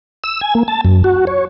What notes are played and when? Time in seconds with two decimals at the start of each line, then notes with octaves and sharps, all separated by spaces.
0.24 E6
0.41 G#5
0.55 A#3
0.68 A5
0.85 F#2
1.04 F#4
1.27 C#5